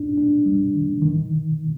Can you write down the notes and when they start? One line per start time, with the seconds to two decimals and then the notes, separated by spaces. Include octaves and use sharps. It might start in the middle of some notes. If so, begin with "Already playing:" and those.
Already playing: D4
0.18 D4
0.45 G3
0.74 D#3
1.02 D#3